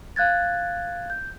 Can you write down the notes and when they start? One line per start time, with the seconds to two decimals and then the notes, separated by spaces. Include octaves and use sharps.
0.16 F5 F#6 G#6 A6
1.10 G6